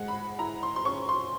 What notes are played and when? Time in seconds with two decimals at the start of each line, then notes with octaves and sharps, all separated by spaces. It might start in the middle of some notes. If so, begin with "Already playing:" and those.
Already playing: G#3 F#5
0.08 B5
0.39 E4 A#5
0.63 C6
0.76 C6
0.85 C#4 C#6
1.09 C6